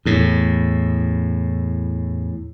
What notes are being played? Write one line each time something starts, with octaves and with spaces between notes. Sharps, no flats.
E2 A2